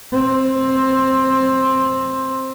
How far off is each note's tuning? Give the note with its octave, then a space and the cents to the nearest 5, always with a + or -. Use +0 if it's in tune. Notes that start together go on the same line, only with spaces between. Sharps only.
C4 +10